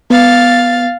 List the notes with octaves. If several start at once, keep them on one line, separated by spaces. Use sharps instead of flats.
B3 F5 A6